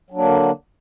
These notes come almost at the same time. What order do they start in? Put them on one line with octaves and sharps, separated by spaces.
F#3 D4 A#3 D3